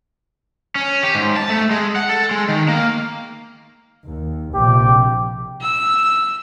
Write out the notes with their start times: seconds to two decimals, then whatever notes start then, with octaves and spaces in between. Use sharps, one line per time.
0.75 C#4
1.03 G4
1.15 G#2
1.36 A5
1.50 A3
1.71 G#3
1.96 F#5
2.09 A4
2.31 G#3
2.49 D#3
2.68 A#3
4.06 D#2
4.55 A#1 C3 G4
5.61 E6